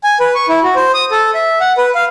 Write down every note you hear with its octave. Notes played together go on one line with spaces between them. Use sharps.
G#5
B4
C#6
E4
F#4
C5
D#6
A4
E5
F#5
B4
F5